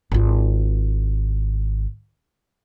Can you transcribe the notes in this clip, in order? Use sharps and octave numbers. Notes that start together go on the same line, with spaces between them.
G#1 F4